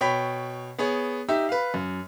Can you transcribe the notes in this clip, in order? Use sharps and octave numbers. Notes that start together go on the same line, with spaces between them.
B2 C#5 G5 B5 B6
B3 G#4 C#5
D#4 G4 E5
B4 F5
F#2